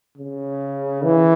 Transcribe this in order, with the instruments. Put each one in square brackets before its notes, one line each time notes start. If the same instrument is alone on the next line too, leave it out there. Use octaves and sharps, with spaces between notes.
[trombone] C#3
E3